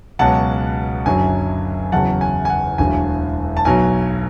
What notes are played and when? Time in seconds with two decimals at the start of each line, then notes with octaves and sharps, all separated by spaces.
0.19 C#2 B2 F#3 F#5 A5
1.06 F#1 F#2 D3 F#3 G#5
1.92 F#1 E2 C#3 F#3 F#5 A5
2.21 G#5
2.45 G#5
2.50 F#5
2.78 E1 D2 D3 F#3 G#5
3.57 A5
3.65 B1 B2 F#3 G#5